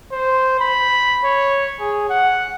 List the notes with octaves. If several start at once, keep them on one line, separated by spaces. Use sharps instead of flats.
C5
B5
C#5
G#4
F#5